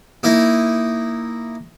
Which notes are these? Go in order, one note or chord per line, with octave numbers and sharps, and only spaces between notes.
A#3 D#4 E4